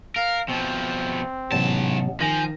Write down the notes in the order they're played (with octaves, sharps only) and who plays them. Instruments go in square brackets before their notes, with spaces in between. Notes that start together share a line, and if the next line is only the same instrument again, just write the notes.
[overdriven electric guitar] A#4 [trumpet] F5
[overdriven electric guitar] B2 F3 [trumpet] C4
[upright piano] A1 [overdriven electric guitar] G#2 A5 [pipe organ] C3 F#3 B3
[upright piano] D#3 A#6 [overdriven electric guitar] F3 [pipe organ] G#5 G6